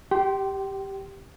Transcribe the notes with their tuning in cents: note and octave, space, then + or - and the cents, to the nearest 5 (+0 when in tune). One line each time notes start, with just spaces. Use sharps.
G4 +0 G5 -30 C6 +0